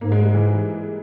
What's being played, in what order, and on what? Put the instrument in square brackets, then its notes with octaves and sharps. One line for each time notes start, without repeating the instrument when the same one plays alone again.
[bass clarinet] G#2 [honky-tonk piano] A#3
[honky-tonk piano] G#3
G3
E3